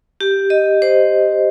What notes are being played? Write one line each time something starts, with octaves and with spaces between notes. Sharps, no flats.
G4
D#5
C5